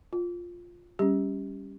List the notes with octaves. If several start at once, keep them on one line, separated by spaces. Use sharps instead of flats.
F4
G3 C#4 G4